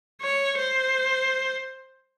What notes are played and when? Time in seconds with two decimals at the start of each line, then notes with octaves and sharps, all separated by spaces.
0.22 C#5
0.57 C5